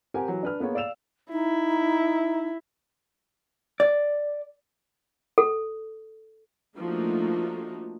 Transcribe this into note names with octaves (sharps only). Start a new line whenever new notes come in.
C4 G4 A#4 F#5 G#5
E3 F#3
D4 B4 F6
A#3 B3 G#4 C#5
D5 F5 E6 E7 F7
D#4 E4
D5
A4
F3 A3 A#3 D4 D#4 F#4